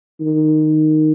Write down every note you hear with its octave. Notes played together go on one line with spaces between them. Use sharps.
D#3